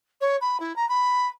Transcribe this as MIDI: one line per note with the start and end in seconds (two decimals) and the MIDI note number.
0.21 0.37 73
0.41 0.58 83
0.60 0.75 64
0.76 0.88 82
0.89 1.28 83